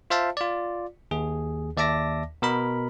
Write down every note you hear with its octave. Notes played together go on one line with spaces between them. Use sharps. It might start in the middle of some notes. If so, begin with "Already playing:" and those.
F4 C5 E5 F5 A5
F4 D5
D#2 G#4
D#2 D5 E5 A5 D6 A#6
B2 A#4 B5